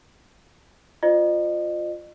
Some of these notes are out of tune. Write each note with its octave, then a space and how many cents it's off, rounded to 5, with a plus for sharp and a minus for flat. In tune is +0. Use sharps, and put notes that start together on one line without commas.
F4 +0 C5 +0 D#5 -40